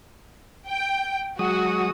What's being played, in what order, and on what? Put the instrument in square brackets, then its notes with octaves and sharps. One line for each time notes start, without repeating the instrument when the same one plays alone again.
[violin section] G5
[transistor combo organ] F#3 G#3 D#6 [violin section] F#4